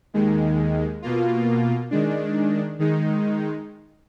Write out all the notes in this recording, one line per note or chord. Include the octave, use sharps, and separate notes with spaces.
D#2 D#3 G#3
B2 A#3 F4
D#3 G#3 D4
D#3 G#3 D#4